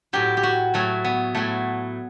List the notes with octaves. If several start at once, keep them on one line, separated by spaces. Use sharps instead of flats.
A2 F#3 G4
G4
F#4
A2 F#3 A3
B3
A2 F#3 A3